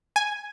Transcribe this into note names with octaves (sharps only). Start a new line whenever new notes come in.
G#5